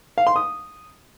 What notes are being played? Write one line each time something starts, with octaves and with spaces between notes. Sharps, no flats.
F5
C6
D#6